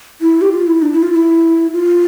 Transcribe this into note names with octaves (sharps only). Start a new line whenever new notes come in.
E4
G4
F4
E4
D4
E4
F4
E4
F4